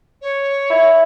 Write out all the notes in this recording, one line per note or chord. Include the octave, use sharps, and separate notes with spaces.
C#5
E4